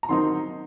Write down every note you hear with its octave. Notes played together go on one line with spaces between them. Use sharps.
A#5
D#3 F#3 C4 D#4 C6